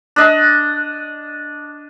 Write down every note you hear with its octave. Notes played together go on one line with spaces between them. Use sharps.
D4 D#5